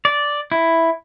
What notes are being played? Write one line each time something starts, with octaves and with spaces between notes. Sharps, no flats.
D5
E4